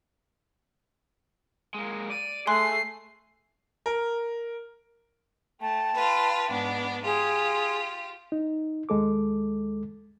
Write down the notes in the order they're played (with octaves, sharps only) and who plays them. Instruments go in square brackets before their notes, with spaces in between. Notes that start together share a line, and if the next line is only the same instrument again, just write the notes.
[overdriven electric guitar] G#3 A#3
[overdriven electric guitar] D5 [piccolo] D#7
[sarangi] A3 [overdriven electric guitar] G#4 [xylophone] G#5 C6 F#6 [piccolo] C7
[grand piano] A#4
[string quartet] A3 [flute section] G5 A5
[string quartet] F4 B4
G#2 B3 D4
[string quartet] F4 G4 [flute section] G#4
[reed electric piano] D#4
D#2 G#3 A4 D6